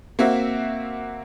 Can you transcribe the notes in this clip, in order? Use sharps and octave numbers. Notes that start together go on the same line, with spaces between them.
A#3 C4 F#4 E5